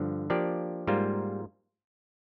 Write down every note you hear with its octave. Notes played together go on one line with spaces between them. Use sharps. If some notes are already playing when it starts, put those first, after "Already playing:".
Already playing: G2 D3 F3
F3 A#3 D4 G4 D5
G#2 G3 A#3 F4 C5